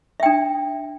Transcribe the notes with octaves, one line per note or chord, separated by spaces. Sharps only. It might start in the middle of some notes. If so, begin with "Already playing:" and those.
D4 E5 G5